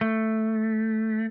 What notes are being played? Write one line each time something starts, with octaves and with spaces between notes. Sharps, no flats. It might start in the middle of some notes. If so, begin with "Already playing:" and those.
A3